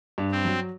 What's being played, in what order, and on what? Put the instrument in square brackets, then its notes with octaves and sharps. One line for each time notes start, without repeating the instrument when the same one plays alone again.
[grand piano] G2
[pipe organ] C4
[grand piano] F#3